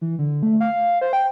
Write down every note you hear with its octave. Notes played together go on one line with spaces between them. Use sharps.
E3
D3
A3
F5
C5
G5